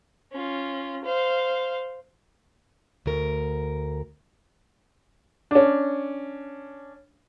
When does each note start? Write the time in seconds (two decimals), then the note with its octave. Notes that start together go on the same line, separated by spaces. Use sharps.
0.32 C#4 F4
1.05 C5 F5
3.06 D2 A#4
5.51 C#4 D4